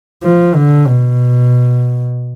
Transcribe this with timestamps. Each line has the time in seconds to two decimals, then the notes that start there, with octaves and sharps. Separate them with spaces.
0.24 F3
0.55 D3
0.87 B2